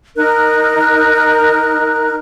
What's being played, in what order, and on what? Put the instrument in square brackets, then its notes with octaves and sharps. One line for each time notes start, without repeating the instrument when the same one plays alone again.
[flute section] D#4 A#4 F#6